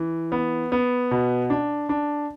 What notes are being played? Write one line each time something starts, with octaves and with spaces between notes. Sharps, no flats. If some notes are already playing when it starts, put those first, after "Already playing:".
Already playing: E3
B3
B3
B2
D4
D4